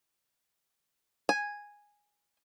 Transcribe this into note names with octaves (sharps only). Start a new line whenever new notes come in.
G#5